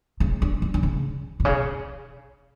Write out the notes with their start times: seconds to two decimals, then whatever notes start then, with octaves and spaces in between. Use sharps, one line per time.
0.20 C#3
0.42 D3
0.62 D3
0.74 D3
0.83 C#3
1.40 B2
1.45 C#3